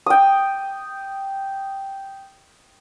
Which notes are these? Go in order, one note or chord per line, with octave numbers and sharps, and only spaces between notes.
G5 D#6